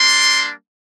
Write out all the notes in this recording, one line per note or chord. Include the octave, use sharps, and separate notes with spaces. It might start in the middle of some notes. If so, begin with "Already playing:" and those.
Already playing: G3 A#3 D4 C6